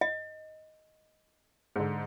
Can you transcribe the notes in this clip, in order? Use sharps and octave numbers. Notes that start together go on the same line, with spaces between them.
D#5
G#2 D3